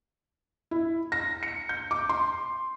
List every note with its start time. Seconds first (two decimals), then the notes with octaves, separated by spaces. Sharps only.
0.71 E4
1.12 A#6
1.43 C#7
1.69 G6
1.91 D6
2.09 C6